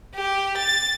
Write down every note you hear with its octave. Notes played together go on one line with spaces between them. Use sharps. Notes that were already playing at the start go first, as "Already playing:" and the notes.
G4
A6